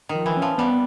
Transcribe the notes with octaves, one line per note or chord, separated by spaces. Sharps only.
D#3
F3
E3
C#4
F3
G3 B3